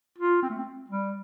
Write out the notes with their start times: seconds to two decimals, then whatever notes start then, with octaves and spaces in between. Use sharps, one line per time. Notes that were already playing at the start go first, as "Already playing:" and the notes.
0.19 F4
0.43 C4
0.50 A3
0.58 C4
0.90 G3